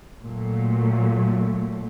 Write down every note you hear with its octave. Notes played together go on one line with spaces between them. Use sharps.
A#2 F#3 A3